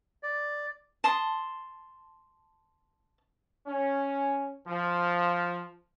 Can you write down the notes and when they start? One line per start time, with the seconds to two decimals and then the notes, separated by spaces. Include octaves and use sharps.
0.23 D5
1.04 A5 C6 D#6
3.67 C#4
4.67 F3